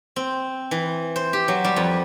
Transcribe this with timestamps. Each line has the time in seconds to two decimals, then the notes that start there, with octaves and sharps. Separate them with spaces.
0.16 C4
0.71 E3
1.16 C5
1.33 G4
1.48 F#3
1.64 G3
1.76 F2